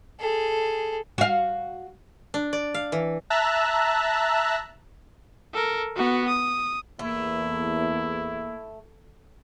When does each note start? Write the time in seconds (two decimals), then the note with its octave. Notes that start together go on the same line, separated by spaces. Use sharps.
0.20 G#4 A4
1.18 F#4 F5
2.34 D4
2.53 D5
2.74 F5
2.92 E3
3.30 E5 A5 A#5 E6 F#6
5.53 A4 A#4
5.96 B3 F#4
6.28 D#6
6.99 E2 A3 A#3 E4